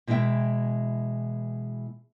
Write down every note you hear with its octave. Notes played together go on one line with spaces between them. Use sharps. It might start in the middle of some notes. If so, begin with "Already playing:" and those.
B2 E3 G#3 E4 E5 G5